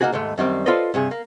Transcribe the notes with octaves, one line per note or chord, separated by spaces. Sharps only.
A#3 B3 D#4 F#4 G#4
D#2 G#2 G#3 A3
F#2 D#3 G3 C4
F4 A4 B4 C5 D5 D#5
G2 C3 G#4
A#3